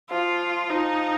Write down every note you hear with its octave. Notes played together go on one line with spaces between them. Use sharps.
F3 F4
F3 D#4